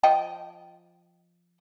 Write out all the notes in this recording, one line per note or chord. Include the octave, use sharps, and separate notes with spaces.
F3 D#5 G5